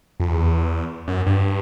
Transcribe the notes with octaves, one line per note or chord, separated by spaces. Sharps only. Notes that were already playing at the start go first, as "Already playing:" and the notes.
F2
E2
F#2
G2